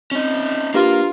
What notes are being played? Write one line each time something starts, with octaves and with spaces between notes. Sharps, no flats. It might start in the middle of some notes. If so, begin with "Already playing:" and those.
C4 C#4 D#4
A#3 D4 F4 G4 A#4 B4